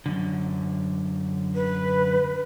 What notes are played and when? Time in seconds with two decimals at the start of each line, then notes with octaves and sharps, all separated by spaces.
0.06 F#2 D3
1.55 B4